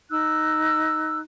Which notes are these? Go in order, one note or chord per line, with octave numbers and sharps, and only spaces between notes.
D#4 E6 F#6